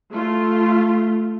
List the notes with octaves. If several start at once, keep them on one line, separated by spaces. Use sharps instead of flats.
A3 F4